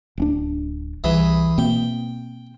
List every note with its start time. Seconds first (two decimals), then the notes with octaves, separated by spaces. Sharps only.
0.18 D1 C#4 D4
1.04 C2 E3 G#4 B5
1.58 B2 A#3 C4 G5